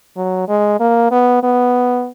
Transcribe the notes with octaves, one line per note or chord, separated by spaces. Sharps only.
F#3
G#3
A#3
B3
B3